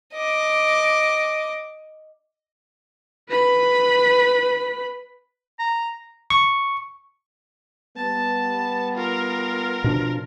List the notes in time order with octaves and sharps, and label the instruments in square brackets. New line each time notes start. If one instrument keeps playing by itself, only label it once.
[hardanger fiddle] D#5 D6
[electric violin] B4 B5
[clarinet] A#5
[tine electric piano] C#6
[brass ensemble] G3 B3 [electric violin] A5
[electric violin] F4 A#4
[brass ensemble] F2 F3 [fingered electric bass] B2 D4